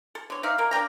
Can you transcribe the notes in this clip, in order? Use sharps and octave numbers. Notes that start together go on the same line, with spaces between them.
A4
D3 C#5
D#4 D5 E5 F5
D#3 A#3 A#4
A#3 D4 G5 A#5